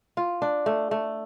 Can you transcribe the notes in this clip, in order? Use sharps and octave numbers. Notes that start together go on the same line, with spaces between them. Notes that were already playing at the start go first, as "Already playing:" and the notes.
F4
D4
A3
A3